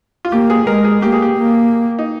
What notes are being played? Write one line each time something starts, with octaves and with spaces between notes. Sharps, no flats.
F4
A#3 G4
G#4
G#3 A#4
G#4
A#3 G4
G#4
G4
A#3
D#4